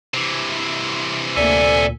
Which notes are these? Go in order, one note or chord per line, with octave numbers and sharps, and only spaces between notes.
C3 E3
D2 A#2 A4 D5 E5 G#5